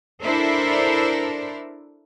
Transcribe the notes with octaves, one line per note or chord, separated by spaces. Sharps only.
D4 E4 A4 A#4 C5 D5